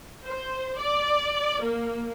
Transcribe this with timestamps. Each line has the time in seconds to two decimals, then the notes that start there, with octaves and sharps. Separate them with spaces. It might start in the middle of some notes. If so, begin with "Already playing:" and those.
0.25 C5
0.78 D5
1.62 A#3